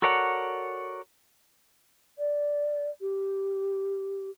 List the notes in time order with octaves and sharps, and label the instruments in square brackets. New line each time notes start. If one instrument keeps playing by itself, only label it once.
[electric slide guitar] F#4 A4 A#4 C#5 D5 F#5
[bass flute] D5
G4